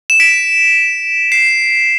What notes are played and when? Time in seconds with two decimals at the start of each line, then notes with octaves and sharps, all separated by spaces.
0.10 E7
0.20 B6 D7
1.32 C7 E7